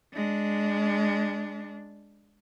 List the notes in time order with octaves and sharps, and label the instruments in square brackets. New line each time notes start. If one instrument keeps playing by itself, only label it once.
[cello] G#3 D4